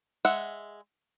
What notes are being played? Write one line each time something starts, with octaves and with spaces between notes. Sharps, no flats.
G#3 E5 F#5